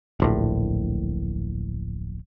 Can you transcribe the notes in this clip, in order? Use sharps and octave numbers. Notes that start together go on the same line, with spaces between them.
D1 A#1 A2